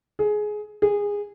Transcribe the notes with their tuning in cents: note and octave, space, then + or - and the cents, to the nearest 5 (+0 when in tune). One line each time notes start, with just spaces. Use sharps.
G#4 +15
G#4 -20